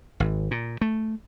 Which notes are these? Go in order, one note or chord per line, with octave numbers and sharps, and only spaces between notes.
G#1
A#2
A3